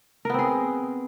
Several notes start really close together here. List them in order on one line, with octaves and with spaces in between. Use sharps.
A#4 B3 C4 G#4